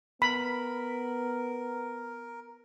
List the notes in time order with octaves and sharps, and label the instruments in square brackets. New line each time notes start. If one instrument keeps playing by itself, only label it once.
[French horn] B3 [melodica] A#4 [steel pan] B5